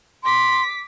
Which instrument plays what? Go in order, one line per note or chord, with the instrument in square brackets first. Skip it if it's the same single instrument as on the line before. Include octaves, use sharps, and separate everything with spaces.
[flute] C6 [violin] D6 B6